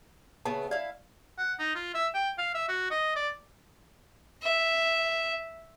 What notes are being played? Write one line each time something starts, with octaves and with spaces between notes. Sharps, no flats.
C#3 A3 B3 A5
E4 D5 F5
F#5
D#4
F4
E5
G5
F5
E5
F#4
D#5
D5
E5